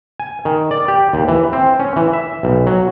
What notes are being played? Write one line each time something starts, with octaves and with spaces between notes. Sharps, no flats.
G#5
D#3
D5
G4
D#2
E3
C4
C#4
E3
E5
B1
F#3